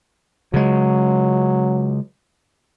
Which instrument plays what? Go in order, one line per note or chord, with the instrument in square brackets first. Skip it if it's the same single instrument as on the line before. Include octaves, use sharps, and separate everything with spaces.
[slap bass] C#3 G#3 [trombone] F#3